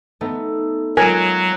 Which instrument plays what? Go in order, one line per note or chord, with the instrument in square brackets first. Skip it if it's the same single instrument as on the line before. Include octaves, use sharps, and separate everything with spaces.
[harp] A3 B3 D#4
[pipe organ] F#3 [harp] G#3 F4 D7 [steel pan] A#4 G#5